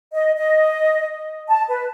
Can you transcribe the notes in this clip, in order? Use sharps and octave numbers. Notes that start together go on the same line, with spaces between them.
D#5
D#5
A5
B4